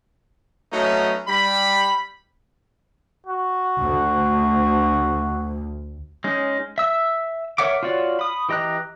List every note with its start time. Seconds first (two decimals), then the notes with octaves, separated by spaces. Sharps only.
0.73 F#3 A3 B3 C#4 D#4
1.28 G3 B5
3.27 F#4
3.80 D2
6.24 G#3 C#4 D#4
6.78 E5 E6
7.58 A#4 C#5 E5 F#5 D6
7.83 F4 F#4 C#5 D5
8.19 B5 D#6
8.49 E3 G4 D#5 A#5 F#6